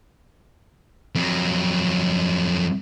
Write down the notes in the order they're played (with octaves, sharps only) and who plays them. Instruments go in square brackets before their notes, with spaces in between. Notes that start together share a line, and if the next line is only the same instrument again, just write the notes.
[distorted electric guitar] F2 F#3